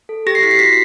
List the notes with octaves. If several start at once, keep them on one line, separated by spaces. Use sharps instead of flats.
A4
G4 A#6
C7
E4 B6
C7
F#4 B6